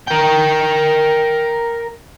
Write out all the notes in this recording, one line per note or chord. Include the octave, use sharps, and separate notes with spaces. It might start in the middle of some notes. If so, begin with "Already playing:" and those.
A#4 G5